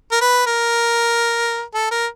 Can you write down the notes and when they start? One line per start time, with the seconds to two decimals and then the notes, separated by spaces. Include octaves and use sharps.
0.12 A#4
0.21 B4
0.47 A#4
1.74 A4
1.91 A#4